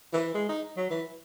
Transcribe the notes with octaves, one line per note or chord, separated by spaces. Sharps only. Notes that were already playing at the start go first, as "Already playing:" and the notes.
E3
G#3
D#4
F#3
E3